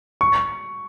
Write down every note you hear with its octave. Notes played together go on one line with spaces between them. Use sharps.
C#6